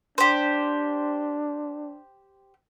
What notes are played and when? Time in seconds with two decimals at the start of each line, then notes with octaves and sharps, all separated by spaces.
0.18 D4 G4 C5